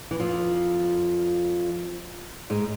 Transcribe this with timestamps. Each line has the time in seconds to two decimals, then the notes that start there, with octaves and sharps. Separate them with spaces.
0.11 E3
0.20 F2 F3
2.50 G#2 G#3